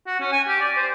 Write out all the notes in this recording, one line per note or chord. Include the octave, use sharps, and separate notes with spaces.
F#4
C#4
G#5
G4
D5
C5